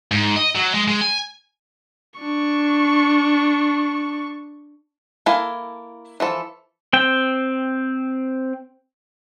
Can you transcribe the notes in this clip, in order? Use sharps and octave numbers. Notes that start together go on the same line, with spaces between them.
G#2
D#5
F#3
G#3
G#3
G#5
D4 C#6
A#3 E4 A4 F5 G#5
E3 F3 A4
C4 G5